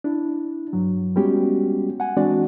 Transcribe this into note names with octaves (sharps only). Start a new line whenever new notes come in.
D4 E4
G2 F#3
G3 G#3 B3 C#4 F#4 G4
F#5 G#5
E3 G#3 C4 D4 F#4 D5